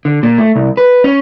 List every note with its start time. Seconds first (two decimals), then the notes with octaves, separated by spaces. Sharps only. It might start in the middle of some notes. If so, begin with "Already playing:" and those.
0.05 D3
0.23 A#2
0.38 A3
0.55 C2
0.77 B4
1.04 C#4